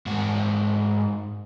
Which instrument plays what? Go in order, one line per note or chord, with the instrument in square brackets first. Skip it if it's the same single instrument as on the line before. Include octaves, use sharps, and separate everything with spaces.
[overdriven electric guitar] G#2 F#4